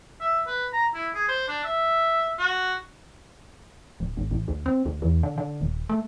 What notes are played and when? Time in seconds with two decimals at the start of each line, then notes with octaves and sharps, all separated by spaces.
0.21 E5
0.47 B4
0.73 A#5
0.94 E4
1.15 G#4
1.29 C5
1.48 D4
1.64 E5
2.39 F#4
4.00 D1
4.17 G#1
4.31 A1
4.48 D2
4.66 C4
4.86 D2
5.02 E2
5.23 D3
5.38 D3
5.61 D#1
5.89 A3